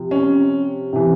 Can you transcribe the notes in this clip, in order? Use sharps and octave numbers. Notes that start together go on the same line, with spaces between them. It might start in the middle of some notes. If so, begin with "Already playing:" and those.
Already playing: C3 F3
C#4
C3 E3